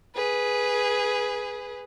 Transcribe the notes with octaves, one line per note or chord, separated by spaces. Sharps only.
G#4 B4